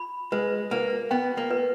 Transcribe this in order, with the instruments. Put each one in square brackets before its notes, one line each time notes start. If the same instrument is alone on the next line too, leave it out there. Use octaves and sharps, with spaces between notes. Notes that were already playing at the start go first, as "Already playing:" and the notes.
Already playing: [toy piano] B5
[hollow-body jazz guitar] G#3 [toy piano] B4
[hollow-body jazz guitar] A#3 [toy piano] B4
[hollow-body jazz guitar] B3 [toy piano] G5
[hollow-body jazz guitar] A#3
[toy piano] B4